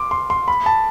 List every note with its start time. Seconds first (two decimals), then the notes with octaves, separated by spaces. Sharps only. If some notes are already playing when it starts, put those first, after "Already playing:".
Already playing: C6 D6
0.11 C6
0.30 C6
0.48 B5
0.66 A5